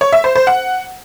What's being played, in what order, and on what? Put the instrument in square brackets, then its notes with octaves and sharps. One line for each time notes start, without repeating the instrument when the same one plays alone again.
[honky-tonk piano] C#5
E5
C5
C5
F#5